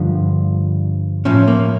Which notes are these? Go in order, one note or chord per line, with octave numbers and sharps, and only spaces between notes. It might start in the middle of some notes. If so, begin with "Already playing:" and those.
Already playing: G2 D3 F3
A2 F3 C#4
A#3